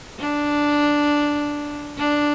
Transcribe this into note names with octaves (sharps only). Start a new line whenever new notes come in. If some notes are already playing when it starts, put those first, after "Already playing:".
D4
D4